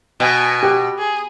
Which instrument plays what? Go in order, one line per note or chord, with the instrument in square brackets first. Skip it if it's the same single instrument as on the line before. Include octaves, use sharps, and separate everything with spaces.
[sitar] B2 [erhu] G#5
[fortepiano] G4
[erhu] G#4